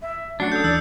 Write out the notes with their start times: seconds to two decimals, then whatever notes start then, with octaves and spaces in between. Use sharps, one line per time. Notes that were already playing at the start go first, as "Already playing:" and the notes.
0.02 E5
0.40 F#3 A3 C#4 D4 F#4 C7 C#7
0.52 A4 D#6 G6
0.64 D#2 D#3 E3 D5 E6 F#6